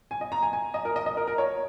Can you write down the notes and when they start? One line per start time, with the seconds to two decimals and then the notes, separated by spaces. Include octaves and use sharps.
0.11 G#5
0.21 D#5
0.32 A#5
0.43 G#5
0.53 G#5
0.74 D#5
0.85 A#4
0.96 D#5
1.06 D#5
1.17 A#4
1.27 A#4
1.38 C#5